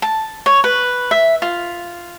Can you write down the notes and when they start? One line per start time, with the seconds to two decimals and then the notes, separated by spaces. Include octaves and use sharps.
0.02 A5
0.46 C#5
0.64 B4
1.11 E5
1.42 F4